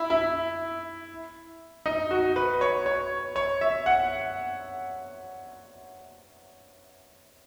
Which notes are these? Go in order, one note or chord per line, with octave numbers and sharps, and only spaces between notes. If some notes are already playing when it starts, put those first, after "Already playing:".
Already playing: E4
E4
D#4
F#4
B4
C#5
C#5
C#5
E5
F#5